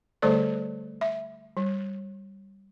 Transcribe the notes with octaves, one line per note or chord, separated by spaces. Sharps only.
D3 G3 A3 A4 C5 D5
E5
G3